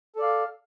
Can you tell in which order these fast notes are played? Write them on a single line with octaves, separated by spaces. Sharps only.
A4 D5 F5